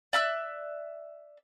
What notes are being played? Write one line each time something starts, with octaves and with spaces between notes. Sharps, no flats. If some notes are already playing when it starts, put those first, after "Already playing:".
D5 E5 E6 F#6